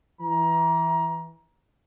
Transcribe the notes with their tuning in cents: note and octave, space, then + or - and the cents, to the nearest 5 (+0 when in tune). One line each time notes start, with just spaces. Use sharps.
E3 +0 A#5 +25